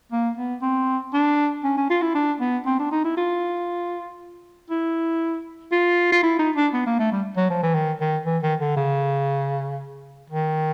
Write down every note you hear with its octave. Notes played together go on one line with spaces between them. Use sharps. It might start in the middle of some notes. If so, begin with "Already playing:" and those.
A#3
B3
C4
D4
C#4
C#4
F4
E4
D4
B3
C4
D4
D#4
E4
F4
E4
F4
F4
E4
D#4
D4
B3
A#3
A3
G3
F#3
F3
E3
D#3
D#3
E3
D#3
D3
C#3
D#3